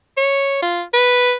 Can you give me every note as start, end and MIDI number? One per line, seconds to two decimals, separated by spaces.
0.18 0.59 73
0.62 0.83 65
0.93 1.34 71